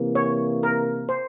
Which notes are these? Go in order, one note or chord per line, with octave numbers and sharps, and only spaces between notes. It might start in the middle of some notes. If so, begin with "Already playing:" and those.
Already playing: C3 E3 A#3
C#5
A#4
C5